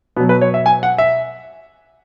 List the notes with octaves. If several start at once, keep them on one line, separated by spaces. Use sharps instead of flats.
B2 F#3 B3
B4
C#5
E5
G#5
F#5
E5